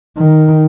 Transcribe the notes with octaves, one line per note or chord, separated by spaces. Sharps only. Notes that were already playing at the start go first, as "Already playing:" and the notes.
D#3